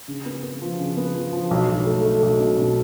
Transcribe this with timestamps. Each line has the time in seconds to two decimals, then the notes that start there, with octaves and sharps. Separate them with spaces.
0.08 C#3
0.26 B3
0.43 B3
0.62 F3
0.79 C#3
0.97 B3
1.15 F3
1.33 F3
1.51 B1
1.69 B1
1.86 A3
2.05 A3
2.23 B1
2.40 B2
2.58 B2